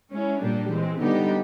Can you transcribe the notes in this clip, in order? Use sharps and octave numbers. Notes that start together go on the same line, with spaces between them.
G#3 C#4 E4
A#2 G3 A#3 D4 G4
E3 G#3 C4
D3 G3 B3 D#4 G4